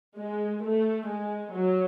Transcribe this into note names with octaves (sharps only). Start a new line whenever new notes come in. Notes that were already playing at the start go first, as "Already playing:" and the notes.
G#3
A3
G#3
F#3